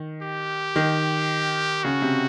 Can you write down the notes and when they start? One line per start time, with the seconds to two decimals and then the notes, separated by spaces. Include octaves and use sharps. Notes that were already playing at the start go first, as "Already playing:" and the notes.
Already playing: D#3
0.22 G4
0.76 D#3
1.84 C#3 F#4
2.02 C3